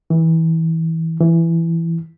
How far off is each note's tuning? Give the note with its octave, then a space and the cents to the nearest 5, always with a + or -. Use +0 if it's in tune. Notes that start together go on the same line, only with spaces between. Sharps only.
E3 -25
E3 +10